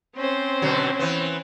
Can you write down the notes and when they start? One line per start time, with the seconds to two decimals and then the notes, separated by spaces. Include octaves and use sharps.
0.16 C4 C#4 C5
0.62 B2 D3 F#3
0.99 E3 B3